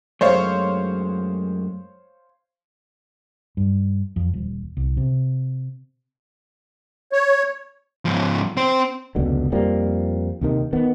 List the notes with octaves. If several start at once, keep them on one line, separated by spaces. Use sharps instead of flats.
F#2 G#3 A3 C5 C#5 F5
G2
F2
D#1
C2
C3
C#5
G#2 F3
C4 C5
F1 C#2 B2 D3
F2 F3 G3 A#3
D#2 C3 D#3
D#3 B3